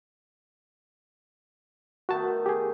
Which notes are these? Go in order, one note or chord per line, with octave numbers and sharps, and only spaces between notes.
D#3 A3 B3 F#4 A5
G4 G#4